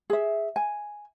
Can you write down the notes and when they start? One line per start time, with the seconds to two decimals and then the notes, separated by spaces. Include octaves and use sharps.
0.10 G#4 E5
0.56 G#5